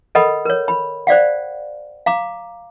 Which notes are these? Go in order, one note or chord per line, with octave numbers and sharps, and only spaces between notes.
A4 A#4 D#5 F#5 B5
A#4 C#5
B5
C5 D5 F5 F#5
F5 A#5 D6